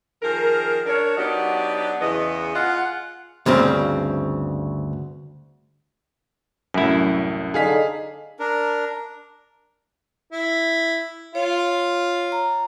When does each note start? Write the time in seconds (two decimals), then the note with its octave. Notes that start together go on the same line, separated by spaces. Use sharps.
0.22 D#3 F3 G#4 A#4
0.86 D4 A#4 C#5
1.17 F#3 B3 D4 D#4 F#4 G4
2.00 E2 C#3 E3 B3 D#5
2.55 F4 G#4 F5 F#5
3.46 D2 G2 C#3 C4
6.74 C2 F#2 A2 E4
7.54 D3 D#4 G#4 F5 B6
8.39 D4 A#4
10.32 E4
11.35 F4 C#5
12.32 A#5